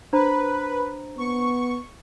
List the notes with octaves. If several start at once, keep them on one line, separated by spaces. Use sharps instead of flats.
D4 B4 C5 A#5
B3 C#6